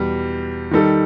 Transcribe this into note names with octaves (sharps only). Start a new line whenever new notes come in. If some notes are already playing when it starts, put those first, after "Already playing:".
Already playing: E2 B2 G3
D#3 G3 D#4 A4